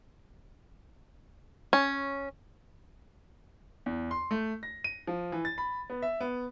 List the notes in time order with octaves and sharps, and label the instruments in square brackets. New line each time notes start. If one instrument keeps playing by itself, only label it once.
[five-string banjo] C#4
[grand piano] E2
C6
A3
A#6
D#7
F3
E3
A6
B5
B3
E5
B3